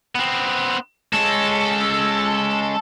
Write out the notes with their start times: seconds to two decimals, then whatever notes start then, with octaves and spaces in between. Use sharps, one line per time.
0.15 B3 C4
1.13 G#3 C#4 A4